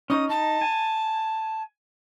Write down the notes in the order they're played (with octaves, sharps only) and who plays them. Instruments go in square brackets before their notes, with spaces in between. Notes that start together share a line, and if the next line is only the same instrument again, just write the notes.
[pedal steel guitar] C#4 D#4 [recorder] D#6
[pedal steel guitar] D#4 [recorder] A5
[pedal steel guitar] G#5